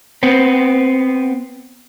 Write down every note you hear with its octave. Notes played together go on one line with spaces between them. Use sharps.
B3 C4